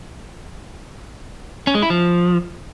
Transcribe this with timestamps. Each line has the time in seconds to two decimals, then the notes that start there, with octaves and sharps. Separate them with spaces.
1.67 C#4
1.75 G#3
1.82 E4
1.90 F3